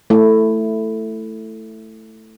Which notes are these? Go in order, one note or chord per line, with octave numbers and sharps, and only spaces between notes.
A3 E4